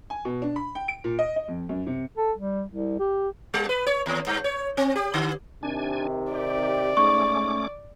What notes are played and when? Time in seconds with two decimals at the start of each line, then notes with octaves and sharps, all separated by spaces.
0.10 G#5
0.25 B2
0.42 D4
0.56 B5
0.75 G5
0.88 D7
1.04 A#2
1.19 D#5
1.36 D#5
1.48 F2
1.69 F#2
1.87 C3
2.17 A4
2.37 G3
2.68 C2
3.00 G4
3.54 G3
3.69 B4
3.87 C#5
4.06 D#2
4.26 G2
4.44 C#5
4.77 C4
4.96 G4
5.14 D3
5.63 C3 D#3 D4 G#5
6.32 G4 D5
6.97 G#2 A3 C#4 C#6 D6